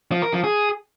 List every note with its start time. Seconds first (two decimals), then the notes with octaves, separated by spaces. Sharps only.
0.12 F3
0.22 A#4
0.33 F3
0.44 G#4